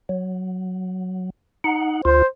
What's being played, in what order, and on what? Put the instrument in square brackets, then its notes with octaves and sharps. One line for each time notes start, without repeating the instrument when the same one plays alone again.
[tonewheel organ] F#3
D#4 F#5
[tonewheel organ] D2 F4 [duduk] C5